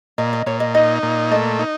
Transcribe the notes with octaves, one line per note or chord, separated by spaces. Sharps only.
A#2 D#5
D#5
A#2 C#5
D#5
D#4 D#5
A#2
A3 D#5
D#4